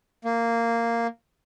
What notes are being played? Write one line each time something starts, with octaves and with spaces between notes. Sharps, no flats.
A#3